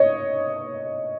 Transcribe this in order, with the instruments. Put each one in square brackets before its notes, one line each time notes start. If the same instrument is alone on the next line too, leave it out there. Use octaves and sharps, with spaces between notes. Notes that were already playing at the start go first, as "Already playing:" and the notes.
Already playing: [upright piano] C#5 D#5